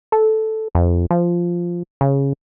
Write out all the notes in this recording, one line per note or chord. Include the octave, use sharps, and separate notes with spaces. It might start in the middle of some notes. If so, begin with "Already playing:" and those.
A4
F2
F3
C#3